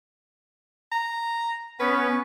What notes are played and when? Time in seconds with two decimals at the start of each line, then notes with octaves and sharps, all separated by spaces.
0.92 A#5
1.80 B3 C#4 B4